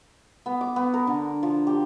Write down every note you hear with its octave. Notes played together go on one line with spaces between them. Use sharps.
B3
D6
B3
A#4
D3
F3
G4